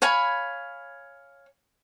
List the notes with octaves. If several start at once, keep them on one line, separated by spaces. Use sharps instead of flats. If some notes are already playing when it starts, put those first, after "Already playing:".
C#5 F5 G#5 B5